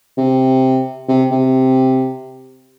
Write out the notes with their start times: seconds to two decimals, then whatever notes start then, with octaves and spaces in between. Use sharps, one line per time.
0.18 C3
1.08 C3
1.31 C3